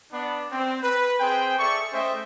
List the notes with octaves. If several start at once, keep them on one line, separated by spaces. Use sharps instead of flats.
B3 D4
C4
B4
C4 G#4 C5 G5
G#4 A4 D5 E5 C#6
A3 C#4 C5 D#5 E5 G5